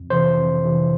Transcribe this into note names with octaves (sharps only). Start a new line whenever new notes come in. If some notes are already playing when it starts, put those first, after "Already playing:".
Already playing: F2
C3 E3 C5
F2
C3 E3